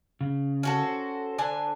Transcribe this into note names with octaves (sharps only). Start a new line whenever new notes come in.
C#3
C#4 F#4 A4
C5
D3 D4 G#5